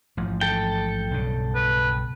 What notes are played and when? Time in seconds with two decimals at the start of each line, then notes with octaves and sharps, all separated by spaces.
0.17 A1 G#2 F3
0.41 A4 G5
1.11 B1 G2 C#3
1.55 B4